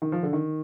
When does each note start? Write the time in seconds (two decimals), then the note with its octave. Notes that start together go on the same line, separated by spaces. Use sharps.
0.02 D#3
0.12 F3
0.23 D3
0.33 D#3